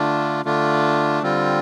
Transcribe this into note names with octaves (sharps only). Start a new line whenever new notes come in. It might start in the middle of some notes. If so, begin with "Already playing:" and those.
Already playing: D3 A3 D4 F4
D3 A3 D4 F4
D3 G3 C4 F4